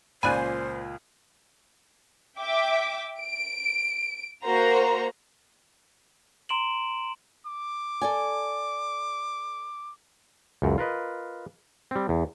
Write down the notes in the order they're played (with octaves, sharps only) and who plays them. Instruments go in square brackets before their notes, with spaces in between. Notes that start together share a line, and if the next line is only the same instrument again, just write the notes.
[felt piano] C#2 A#2 [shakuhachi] C5 [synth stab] D5 G#5 [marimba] B5 F#6
[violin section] E5 G5 D6
D7
A#3 F#4 C5 A#5
[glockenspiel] A#5 C6 D7 E7 F#7
[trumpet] D6
[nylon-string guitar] A4 D5 G#5
[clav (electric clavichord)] C#2 F#2
F4 A#4 B4 D#5
G3 C4
E2